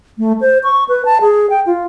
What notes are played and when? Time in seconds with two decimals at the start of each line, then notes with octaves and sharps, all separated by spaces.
0.18 A3
0.41 C5
0.64 C#6
0.89 B4
1.05 A5
1.22 G#4
1.50 G5
1.66 F4